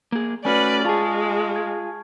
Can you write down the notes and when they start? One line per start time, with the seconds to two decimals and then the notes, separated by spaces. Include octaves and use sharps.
0.12 A#3 G#4
0.45 A3 C#4 F#4 B4 D5 G#5 F6 C#7
0.85 G#3 F4 G#4 G#5 A5 C#6
1.56 G#6